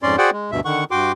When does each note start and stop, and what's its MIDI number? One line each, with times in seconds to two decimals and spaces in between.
0.03 0.16 41
0.03 0.16 44
0.03 0.16 61
0.03 0.16 74
0.03 0.16 84
0.18 0.30 66
0.18 0.30 68
0.18 0.30 72
0.18 0.30 74
0.18 0.30 78
0.18 0.30 79
0.32 0.51 56
0.52 0.60 38
0.52 0.60 43
0.52 0.60 47
0.52 0.60 76
0.65 0.84 50
0.65 0.84 51
0.65 0.84 78
0.65 0.84 85
0.91 1.12 43
0.91 1.12 66
0.91 1.12 79
0.91 1.12 84
0.91 1.12 86